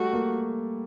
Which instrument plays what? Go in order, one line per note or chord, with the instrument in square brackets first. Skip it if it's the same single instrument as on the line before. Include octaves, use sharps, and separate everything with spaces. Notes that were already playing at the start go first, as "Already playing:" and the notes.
Already playing: [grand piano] G3 A3 [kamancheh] F#4
[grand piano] A#3